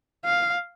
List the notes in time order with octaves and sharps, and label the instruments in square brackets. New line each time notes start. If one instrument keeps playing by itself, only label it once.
[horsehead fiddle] F5